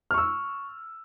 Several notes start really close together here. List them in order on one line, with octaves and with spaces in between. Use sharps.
F6 C#6 E6